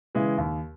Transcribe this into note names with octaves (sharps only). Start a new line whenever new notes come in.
C#3 E3 G#3
D#2